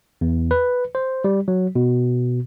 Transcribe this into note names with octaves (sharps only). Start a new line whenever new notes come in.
E2
B4
C5
G3
F#3
B2